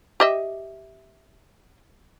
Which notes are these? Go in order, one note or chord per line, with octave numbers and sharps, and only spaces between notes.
G4 D#5 E5